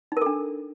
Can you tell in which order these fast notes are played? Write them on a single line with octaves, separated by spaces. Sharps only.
D#4 A#4 A4 D4